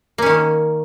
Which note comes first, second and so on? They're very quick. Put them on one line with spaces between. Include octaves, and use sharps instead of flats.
A#3 C#4 D#3